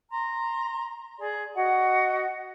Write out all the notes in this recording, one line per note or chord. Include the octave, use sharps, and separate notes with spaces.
A#5 C6
G#4 D5
F#4 D#5 F#5